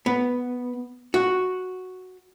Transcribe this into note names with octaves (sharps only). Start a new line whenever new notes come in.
B3
F#4